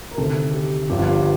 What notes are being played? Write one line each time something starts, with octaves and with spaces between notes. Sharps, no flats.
A#4
D2 C3 D#3 A4
G4
G1 G2 F3 G4
F4
G4